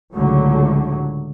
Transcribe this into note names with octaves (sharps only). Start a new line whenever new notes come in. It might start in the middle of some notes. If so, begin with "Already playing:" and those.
C#2 A2 D3 F#3